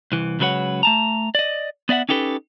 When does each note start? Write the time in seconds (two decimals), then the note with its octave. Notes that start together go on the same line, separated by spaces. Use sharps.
0.12 C2 E3
0.39 C#2 C#3 F#3 B4 C#5 F#5
0.83 A3 A5 A#5
1.35 D5 D#5
1.89 B3 D5 E5 F#5
2.09 C#4 D#4 G4 A4 B4